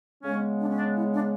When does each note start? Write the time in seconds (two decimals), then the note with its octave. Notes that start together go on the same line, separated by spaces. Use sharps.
0.23 C#3 G#3 B3 C#4
0.59 D4
0.68 C#4
0.79 D4
0.94 E4
1.12 D4